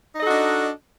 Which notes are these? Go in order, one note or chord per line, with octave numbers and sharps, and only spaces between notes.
D4 D#4 F#4 A4 D#5